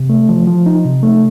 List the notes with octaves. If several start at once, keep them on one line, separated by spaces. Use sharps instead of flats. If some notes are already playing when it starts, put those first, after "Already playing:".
Already playing: C3
A3
F3
F3
D#4
C3
A3